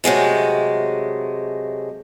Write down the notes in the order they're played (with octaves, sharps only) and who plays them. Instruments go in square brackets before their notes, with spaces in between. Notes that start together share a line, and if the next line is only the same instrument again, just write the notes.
[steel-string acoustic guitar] C3 F#3 G#3 A3